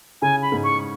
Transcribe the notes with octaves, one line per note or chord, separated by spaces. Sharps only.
C#3 G#5
B5
G#2
C#6